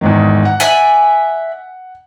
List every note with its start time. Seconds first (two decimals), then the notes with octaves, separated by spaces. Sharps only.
0.01 E2 G#2 D#3
0.45 F#5
0.60 D5 E5 G#5